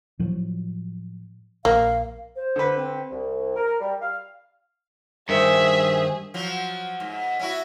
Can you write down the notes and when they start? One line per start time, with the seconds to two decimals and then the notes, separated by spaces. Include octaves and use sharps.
0.19 A2 F3 F#3
1.65 A#1 A#3 F5
2.36 C5
2.56 D3 B4
2.76 C4
3.11 C2
3.56 A#4
3.81 G3
4.01 F5
5.29 G2 D#3 G#4 A#4 C5 E5
6.34 F3 F#3
7.00 G#2
7.39 C#4 E4 F#4